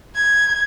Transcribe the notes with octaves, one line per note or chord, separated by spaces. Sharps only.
G#6